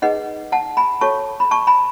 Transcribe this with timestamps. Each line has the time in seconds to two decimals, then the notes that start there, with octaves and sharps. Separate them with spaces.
0.02 D#4 G#4 B4 D#5 F#5
0.52 F#5 A5
0.77 G#5 B5
1.01 F#4 A4 C#5 A5 C#6
1.40 B5
1.51 A5 C#6
1.67 G#5 B5